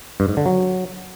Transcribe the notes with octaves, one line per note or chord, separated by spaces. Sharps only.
G2
G#2
D3
F#3